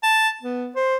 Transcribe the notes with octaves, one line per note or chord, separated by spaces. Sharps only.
A5
B3
C5